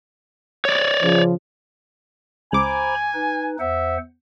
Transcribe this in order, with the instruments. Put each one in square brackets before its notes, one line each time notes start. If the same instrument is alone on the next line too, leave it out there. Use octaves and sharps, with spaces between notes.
[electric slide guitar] C#5 D5
[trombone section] C#3 F3
[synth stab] C#2 D6 [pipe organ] C5 A#5 B5 [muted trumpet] G#5
[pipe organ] D#4 B4
[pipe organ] E2 C5 F#5 [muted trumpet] E5